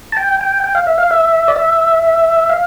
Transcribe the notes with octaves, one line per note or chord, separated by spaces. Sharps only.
A5
G5
G5
G5
F5
E5
F5
E5
D5
E5
F5